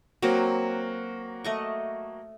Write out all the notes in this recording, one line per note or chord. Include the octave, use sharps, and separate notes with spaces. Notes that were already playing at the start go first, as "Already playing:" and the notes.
F#3 A#3 C4 F#4
A3 D#5 C#6